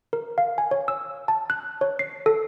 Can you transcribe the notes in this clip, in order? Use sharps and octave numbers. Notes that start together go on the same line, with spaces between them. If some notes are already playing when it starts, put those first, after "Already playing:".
A#4
F5
G#5
C#5
E6
A5
F#6
C#5
C7
A4